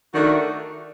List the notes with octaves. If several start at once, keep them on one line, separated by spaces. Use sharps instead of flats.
D#3 A3 D4 F#4